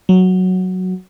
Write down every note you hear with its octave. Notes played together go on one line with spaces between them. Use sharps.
F#3